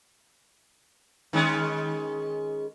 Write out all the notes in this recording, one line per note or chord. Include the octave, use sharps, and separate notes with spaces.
D#3 G#3 C#4